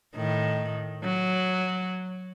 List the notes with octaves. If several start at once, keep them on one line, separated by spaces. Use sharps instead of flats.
A2 D#3
F#3